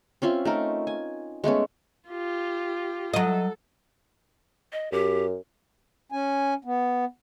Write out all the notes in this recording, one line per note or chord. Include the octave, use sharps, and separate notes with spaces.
C4 C#4 F4 E5
A3 D#4 A#4
G#5
G#3 A3 B3 C#4
F4 G4
F#3 A4 D#5
D#5
F#2 G4
C#4 G#5
B3